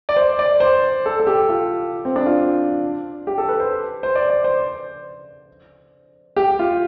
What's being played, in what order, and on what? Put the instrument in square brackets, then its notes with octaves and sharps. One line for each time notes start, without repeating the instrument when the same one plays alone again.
[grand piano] D5
C5
D5
C5
A4
A4
G4
F4
C4
D4
F4
G4
A4
B4
C5
C5
D5
D5
C5
G4
F4